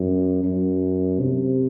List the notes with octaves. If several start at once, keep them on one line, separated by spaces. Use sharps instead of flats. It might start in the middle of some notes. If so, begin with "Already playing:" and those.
Already playing: F#2
F#2
C3